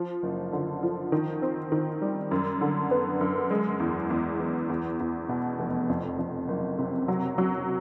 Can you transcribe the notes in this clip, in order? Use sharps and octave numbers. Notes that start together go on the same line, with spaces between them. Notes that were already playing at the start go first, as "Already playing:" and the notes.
Already playing: F3
F#1
D3
F3
D#3
C4
D#3
G3
F#2
D3
B3
F#2
G#3
E2
E2
E3
E2
E2
B2
F1
F2
F2
F#1
C3
F#3
F#3